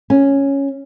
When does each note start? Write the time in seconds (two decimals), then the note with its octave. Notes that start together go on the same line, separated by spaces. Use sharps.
0.10 C#4